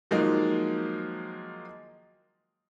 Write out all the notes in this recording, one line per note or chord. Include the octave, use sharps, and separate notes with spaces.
D#3 F3 F#3 G#3 A#3 D#4